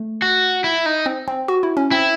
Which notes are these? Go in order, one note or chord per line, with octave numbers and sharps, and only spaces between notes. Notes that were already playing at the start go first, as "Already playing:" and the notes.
Already playing: A3
F#4
E4
D#4
C4
C4
F#4
E4
C#4
C4 E4